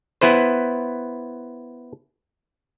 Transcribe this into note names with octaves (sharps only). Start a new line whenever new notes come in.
B3 E4 B4 C5